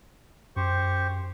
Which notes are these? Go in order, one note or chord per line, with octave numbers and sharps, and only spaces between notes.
F#2 G4 C5 C#6